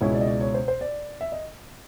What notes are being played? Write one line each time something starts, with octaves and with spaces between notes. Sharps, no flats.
C#2 B2 G#3 C#4 E4 C#5
D5
D#5
D5
C#5
C5
C5
D5
E5
D#5